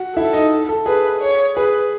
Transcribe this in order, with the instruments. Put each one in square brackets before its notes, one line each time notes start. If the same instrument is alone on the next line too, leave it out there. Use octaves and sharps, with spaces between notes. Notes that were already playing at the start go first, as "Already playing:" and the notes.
Already playing: [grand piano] F#4 F#5
[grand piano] E4 E5 [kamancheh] A4
[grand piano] D#4 D#5
A4
[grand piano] G#4 [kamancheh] B4
[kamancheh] C#5
[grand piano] G#4 [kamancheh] B4